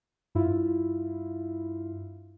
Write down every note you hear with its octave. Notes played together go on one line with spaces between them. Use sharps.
G2 E4 F4